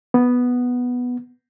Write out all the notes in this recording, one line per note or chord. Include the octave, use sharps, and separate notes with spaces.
B3